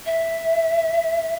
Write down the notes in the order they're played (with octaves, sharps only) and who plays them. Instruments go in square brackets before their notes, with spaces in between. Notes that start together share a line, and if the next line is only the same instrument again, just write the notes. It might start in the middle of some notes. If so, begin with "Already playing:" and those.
[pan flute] E5